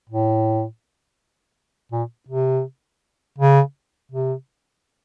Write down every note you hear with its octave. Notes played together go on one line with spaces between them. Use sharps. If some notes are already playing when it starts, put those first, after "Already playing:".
A2
A#2
C3
C#3
C3